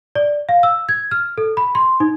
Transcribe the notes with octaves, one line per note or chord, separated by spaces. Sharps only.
D5
F5
E6
G#6
F6
A4
B5
C6
D#4